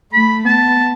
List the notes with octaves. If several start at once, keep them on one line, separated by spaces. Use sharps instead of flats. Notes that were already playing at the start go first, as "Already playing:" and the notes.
A3 B5
B3 A5